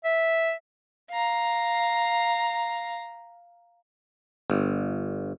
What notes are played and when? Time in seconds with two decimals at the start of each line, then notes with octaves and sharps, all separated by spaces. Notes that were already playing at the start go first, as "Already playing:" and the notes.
0.05 E5
1.11 F5 A#5
4.50 G1